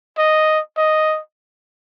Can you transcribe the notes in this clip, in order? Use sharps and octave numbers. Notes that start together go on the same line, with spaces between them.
D#5
D#5